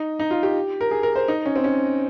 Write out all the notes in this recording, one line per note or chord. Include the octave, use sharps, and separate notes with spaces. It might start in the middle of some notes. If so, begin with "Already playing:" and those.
Already playing: D#4
D#4
F4
G4
A#4
G#4
A#4
C5
D#4
C#4
C4
C#4